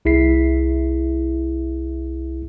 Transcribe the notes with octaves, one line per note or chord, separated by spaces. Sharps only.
C2 E4 G#4 E5 B6 C7